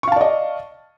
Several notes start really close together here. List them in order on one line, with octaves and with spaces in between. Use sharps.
C#6 F5 A5 D5 D#5